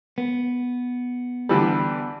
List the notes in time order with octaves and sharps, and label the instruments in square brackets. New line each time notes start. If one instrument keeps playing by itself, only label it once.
[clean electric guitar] B3
[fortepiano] D3 E3 G3